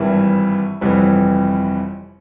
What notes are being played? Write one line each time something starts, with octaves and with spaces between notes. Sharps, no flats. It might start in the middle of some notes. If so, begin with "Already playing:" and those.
Already playing: G#1 G2 E3 G3 E5
G1 F2 C3 E3 G3